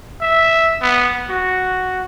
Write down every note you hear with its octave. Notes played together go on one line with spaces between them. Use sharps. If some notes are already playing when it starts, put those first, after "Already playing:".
E5
B3
F#4